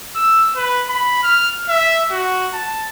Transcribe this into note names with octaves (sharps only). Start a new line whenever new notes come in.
E6
B4
B5
F6
E5
F#4
A5